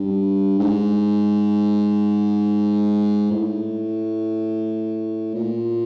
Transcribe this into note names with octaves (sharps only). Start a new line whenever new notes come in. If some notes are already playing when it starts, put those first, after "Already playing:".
Already playing: G2
G#2
A2
A#2